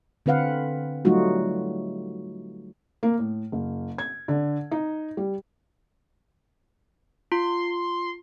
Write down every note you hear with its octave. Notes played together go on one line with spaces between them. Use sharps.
D3 C4 B4 F5 F#5
F#3 G3 A3 D#4 F4 F#4
A#3
A2
F#1
G#6
D3
D#4
G3
F4 C6